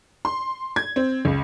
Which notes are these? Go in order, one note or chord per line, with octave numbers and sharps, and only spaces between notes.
C6
G#6
C4
C#2